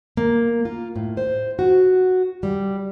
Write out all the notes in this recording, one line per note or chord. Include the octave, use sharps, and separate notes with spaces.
A#3
F4
A2
C5
F#4
G3